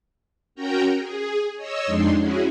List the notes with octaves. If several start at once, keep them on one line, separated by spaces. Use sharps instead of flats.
C#4 F#4 A#4 G5 A#5
G#4
C#5 D#5 E6
F2 G#3 D4 D#4 C6
C#4 E4 F#4 G#4